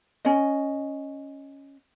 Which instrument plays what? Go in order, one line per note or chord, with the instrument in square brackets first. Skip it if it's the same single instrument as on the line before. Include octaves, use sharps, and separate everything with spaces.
[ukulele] C#4 D#5